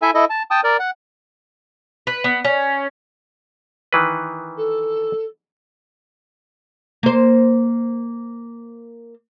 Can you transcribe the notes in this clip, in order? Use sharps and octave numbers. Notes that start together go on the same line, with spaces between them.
E4 A4 E5 G#5
E4 A4 D#5
A5
G5 A5 D#6
A#4 D5
F#5
B4
B3
C#4
D#3 E3 B4
A4
A#3 C5